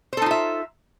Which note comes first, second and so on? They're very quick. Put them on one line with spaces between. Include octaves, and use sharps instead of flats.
C5 A4 D#4 F4 E5